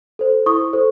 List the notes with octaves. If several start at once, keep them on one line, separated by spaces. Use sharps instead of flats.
A4 C5
E4 C#6 D#6
A4 C5